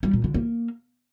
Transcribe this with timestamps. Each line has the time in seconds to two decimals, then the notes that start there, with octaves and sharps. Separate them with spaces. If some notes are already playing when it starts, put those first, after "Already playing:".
0.03 G3
0.13 A#2
0.24 D3
0.34 A#3